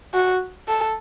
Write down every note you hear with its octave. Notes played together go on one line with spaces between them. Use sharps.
F#4
A4